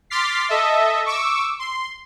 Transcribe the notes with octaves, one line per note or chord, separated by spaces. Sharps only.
C6 D6 F6 A6 B6 C7
A4 D#5 E5
C#6 D6 E6
C6